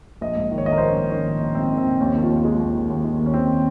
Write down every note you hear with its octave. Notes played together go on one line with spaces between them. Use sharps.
A#1 D#5
G#2
D#3
C#5
A#1 D#5
A#4
C5
A#1
C#4
G#2
D#3 C#4
A#1
A#1
G#2 C4
D#3
C4
A#1
D#2 C#4
D#3
F4
D#2
D#3 G#3
D#2
D#3
D#2
D#3
D#2
C#4
D#3 C4